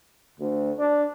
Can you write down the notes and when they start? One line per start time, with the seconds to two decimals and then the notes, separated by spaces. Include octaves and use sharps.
0.40 D2
0.79 D4